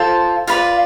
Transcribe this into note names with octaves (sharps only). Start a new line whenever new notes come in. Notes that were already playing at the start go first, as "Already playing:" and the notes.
Already playing: F4 A4 C5
F4 B4 D5 F5